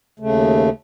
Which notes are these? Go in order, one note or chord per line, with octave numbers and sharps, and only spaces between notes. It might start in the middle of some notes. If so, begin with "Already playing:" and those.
D#2 C#3 A3